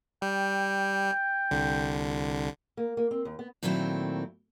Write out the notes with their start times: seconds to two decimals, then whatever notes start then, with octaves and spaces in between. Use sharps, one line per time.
0.22 G3 G5
1.51 C2 D3
2.77 A#3
2.97 A#3
3.11 C4
3.25 D#2
3.39 B3
3.63 A#2 D#3 F#3 A3 C4 E4